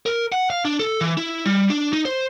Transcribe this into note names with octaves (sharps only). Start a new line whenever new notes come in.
A#4
F#5
F5
D4
A4
E3
E4
G3
D4
D#4
C5